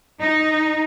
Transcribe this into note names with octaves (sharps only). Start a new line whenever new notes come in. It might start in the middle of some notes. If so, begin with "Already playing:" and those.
D#4